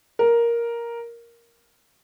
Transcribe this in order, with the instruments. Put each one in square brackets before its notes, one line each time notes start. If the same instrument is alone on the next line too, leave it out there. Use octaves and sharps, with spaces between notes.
[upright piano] A#4